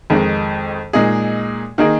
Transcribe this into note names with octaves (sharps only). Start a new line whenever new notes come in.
F2 D#3 G#3 D#4
A#2 G#3 D#4 G#4
D#3 A#3 D#4 G#4